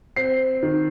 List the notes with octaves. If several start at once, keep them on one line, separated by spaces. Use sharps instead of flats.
C4 C7
D#3